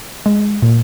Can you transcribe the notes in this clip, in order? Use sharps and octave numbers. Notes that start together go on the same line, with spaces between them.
G#3
A#2